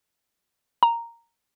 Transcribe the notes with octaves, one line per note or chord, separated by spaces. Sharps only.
A#5